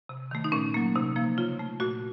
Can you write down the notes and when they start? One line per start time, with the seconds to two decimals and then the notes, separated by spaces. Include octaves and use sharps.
0.09 C3
0.31 D#3 A3
0.44 D#4
0.52 A#2 C#4
0.74 F#3 A#3
0.95 C3 D#4
1.16 F3 A#3
1.38 C#3 F4
1.59 A3
1.80 A#2 F#4